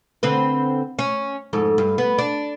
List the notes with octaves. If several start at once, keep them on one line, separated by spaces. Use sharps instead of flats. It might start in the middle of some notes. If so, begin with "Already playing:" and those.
D3 C4 B4
C#4
F2 G#2 A4
G2
B3
D4